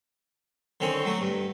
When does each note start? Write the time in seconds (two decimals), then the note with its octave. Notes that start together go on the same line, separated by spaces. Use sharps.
0.80 D3 D#3 C4 C#4
1.05 F#3 A3
1.21 G2